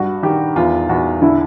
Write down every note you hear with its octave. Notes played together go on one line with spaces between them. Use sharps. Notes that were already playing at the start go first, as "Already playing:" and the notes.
Already playing: G2 F#4
D#3 G4
E2 F4
E2 F#4
D3 E4